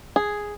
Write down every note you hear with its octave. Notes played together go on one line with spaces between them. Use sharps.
G#4